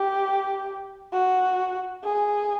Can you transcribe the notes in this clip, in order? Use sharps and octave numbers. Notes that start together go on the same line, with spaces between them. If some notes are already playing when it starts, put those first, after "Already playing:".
Already playing: G4
F#4
G#4